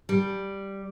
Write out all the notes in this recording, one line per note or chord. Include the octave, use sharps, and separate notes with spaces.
G3